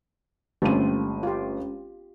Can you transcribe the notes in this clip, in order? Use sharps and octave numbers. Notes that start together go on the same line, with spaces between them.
G1 G#3 A3 C4 C#4 F4 G4 D#7
F4 G4